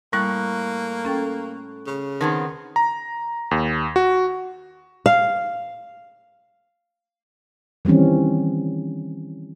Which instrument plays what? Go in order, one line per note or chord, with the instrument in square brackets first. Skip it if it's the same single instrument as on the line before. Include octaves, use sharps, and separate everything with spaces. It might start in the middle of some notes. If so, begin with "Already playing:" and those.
[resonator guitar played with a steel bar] A2 [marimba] G3 [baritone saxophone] A#3 [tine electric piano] C#6 F#6
[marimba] C#4 A4 G5
[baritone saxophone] C#3
[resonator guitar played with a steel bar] D#3 B3 C4 [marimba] A#4 A5 G#6
[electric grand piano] A#5
D#2
F#4
[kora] F5
[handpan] D#3 E3 G3 C4 C#4